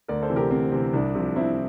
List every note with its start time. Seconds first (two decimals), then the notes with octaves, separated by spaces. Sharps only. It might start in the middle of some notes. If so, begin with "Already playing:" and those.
0.08 D2 A#4 D5
0.22 A4 C5
0.30 C3 E3
0.36 G4 A#4
0.50 D2 C4
0.72 C3 E3 C4
0.93 C2 D4
1.15 C3 F3
1.36 C2 C4 E4